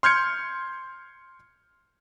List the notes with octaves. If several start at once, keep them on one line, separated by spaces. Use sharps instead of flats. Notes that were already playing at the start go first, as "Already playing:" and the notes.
C6 F6 G6 G#6 C#7